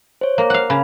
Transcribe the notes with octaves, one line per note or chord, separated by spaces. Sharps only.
C5 C#5
A#3
F5 F#5
C#3 B5